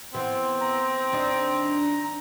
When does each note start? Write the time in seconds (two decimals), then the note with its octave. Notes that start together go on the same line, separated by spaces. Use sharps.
0.14 E3 B3 C4
0.61 A#5
1.12 D#2 D4 D#5